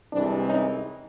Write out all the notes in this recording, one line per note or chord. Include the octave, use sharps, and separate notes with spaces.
C2 C3 E3 G#3 C4 D4
C#4 D#4